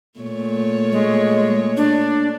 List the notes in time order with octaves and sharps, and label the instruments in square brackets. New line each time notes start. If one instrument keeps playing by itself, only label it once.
[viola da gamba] A#2 A3 C#5
[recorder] G#3
D4